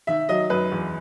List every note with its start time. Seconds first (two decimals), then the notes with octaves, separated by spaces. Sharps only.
0.07 D#3 E5
0.29 F#3 D#5
0.50 F#2 B4
0.72 E2